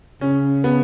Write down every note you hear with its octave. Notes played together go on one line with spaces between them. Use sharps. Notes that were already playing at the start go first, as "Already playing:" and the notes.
C#3 C#4
B3